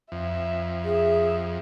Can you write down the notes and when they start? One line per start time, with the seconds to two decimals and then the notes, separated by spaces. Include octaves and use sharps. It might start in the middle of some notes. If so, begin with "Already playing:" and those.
0.12 F2 E5
0.85 G#4 E5